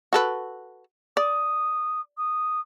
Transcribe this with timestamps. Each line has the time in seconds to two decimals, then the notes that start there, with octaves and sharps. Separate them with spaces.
0.13 F#4 A4 B4
1.17 D5 D#6
2.17 D#6